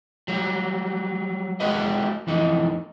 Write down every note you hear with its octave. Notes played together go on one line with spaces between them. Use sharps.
F#3 G3
G#3 F#4 G4 B4 D#5
F2 E3 D#4